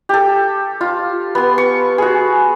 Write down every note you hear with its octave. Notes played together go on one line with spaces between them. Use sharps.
G4 A4
F4
B3 C6
C#6
F#4 G#4